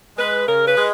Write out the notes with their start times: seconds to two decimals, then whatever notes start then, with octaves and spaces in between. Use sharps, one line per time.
0.17 G#3 B4
0.47 C#3 A#4
0.66 B4
0.77 G#3